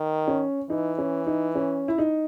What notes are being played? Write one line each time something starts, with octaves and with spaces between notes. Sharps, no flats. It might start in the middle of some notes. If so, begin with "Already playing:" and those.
Already playing: D#3
C#4
E3 D#4
C#4
D#4
C#4
E4
D#4